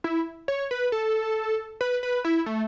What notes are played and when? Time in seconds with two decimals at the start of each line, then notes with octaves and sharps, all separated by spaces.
0.04 E4
0.48 C#5
0.71 B4
0.92 A4
1.81 B4
2.03 B4
2.25 E4
2.46 A3